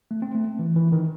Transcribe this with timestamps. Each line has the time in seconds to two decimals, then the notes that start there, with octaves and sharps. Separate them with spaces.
0.11 A3
0.22 C4
0.35 A3
0.59 E3
0.76 E3
0.92 D#3